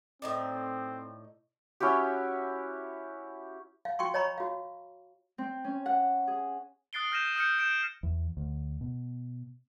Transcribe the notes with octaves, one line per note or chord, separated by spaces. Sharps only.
A2 C4 D#4 D5
C#4 E4 F#4 G4
F5
F#4 G5 C6 C#6
C#5 D#5 A#5 B5 C#6
F#4 F5
C4
C#4
F#5
G#4
D#6 F#6 A6 C7 D7 G7
F6 G6 A#6 D#7 E7
D#6 F6 G6 C#7
G6 D7 E7
E2
D2
B2